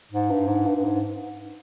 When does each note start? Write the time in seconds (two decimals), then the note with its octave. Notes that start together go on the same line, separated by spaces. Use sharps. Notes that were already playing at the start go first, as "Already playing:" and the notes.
0.12 G#2
0.31 G2
0.48 G#2
0.66 G2
0.76 G2
0.84 G#2